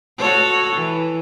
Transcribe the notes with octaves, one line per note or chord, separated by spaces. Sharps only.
F#4 A4 C#5
E3